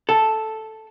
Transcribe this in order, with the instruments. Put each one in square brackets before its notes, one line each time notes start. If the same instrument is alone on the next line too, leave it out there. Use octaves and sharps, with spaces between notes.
[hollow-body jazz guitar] A4